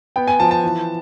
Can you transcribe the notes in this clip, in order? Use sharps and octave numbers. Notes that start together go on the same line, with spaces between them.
B3 G5
G#5
F3 A5
A5
E3